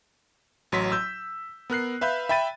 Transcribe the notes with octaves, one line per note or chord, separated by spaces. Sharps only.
A1 F#3 C6 B6
E6 G6
B3 A#4 F#6 C7
B4 E5 F5 B5 G6
E5 G5 B5 A6 D#7